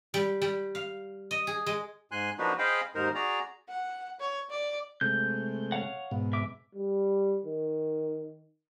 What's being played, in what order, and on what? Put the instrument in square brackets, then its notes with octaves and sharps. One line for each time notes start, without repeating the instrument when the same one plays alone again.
[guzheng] G3
G3
F5
D#5
G#4
G#3
[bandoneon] G#2 G#5 C6 F#6
F3 A#3 D4 D#4 F#4 B4
G#4 C5 D#5 F5 G5 B5
D#2 G#2 D#4 A#4 C5
F#4 G#4 D5 A#5
[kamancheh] F#5
C#5
D5
[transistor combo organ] C3 G#3 A3 [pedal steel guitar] G6
[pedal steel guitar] C#5 F5 F#5
[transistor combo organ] G#2 B2
[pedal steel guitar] E5 D6
[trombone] G3
D#3